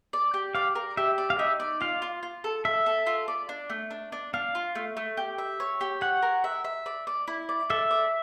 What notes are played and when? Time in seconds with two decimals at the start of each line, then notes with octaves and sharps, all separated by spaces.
0.13 D5
0.34 G4
0.55 D5 F5
0.75 A#4
0.97 G4 E5
1.18 D5
1.30 F5
1.39 D#4 E5
1.60 D5
1.81 F4 F5
2.02 F4
2.23 F4
2.44 A4
2.65 A4 E5
2.86 A4
3.06 F4
3.28 D5
3.49 D4
3.70 A3
3.91 D4
4.12 D4
4.34 D4 F5
4.55 F4
4.75 A3
4.97 A3
5.17 G4
5.38 E5
5.60 C#5
5.81 G4
6.01 C#5 F#5
6.22 A#4
6.44 E5
6.65 E5
6.86 D5
7.07 D5
7.28 E4
7.49 D5
7.70 A4 E5
7.91 D5